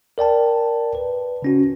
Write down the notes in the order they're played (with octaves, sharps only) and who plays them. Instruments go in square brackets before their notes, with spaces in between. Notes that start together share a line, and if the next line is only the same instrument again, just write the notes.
[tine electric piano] A#4 D5 G5 A5
B4
C#3 C#4 F#4